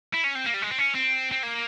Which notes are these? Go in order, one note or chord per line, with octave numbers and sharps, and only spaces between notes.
E4
C#4
C4
A#3
G3
G#3
C4
C#4
C4
C4
A#3